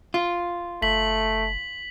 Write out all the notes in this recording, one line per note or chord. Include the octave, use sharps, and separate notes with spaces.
F4
F#1 A3 B6 F#7